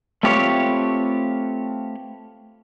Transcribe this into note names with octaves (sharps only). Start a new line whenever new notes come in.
A3 C4 F4 G4 B4 C#5